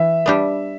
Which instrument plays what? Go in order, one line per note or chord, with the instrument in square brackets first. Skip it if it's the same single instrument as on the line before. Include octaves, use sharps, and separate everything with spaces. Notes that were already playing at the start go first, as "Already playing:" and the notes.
Already playing: [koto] E3 [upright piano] E5
[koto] G3 B3 D4 G4